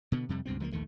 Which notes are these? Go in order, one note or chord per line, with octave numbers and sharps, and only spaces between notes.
B2 D3 B3
F2 C3 G3
C#2 G2 B2 C4
C#2 F3 G3 A#3
A#1 D#2 D#3 A3